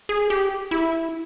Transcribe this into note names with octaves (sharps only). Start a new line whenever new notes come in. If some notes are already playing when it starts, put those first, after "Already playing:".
G#4
G4
E4